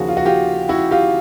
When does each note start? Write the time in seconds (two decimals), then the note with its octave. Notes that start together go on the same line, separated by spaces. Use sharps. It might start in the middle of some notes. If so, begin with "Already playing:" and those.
Already playing: D#2 C#3 F3 F#4 G#4
0.08 F4
0.17 F#4
0.26 F4 G4
0.69 E4 F#4
0.91 F4 G4